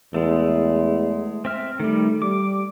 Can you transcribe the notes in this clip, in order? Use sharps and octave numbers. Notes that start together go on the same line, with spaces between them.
E2 G#3 A3
C4 E5 F6
D#3 G3 A3
G3 D6